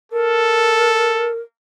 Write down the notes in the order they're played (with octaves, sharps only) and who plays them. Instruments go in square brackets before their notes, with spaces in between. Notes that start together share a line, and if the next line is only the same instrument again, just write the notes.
[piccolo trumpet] A4 [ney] A#4